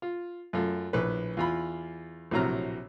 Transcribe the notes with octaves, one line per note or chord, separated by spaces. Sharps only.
F4
F#2 A3 F4
A#1 A2 B4
E2 F4 B5
A#1 A2 C3 F#3 A#5 F6